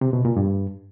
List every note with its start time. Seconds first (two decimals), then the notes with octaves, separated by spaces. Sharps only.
0.01 C3
0.13 B2
0.25 A#2
0.37 G2